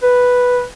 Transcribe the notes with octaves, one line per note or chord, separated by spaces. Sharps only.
B4